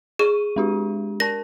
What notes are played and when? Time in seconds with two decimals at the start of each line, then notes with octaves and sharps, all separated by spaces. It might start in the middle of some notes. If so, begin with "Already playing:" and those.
0.19 G#4 C#6 D#7
0.56 G#3 D4 G4
1.20 A#4 A5 A#6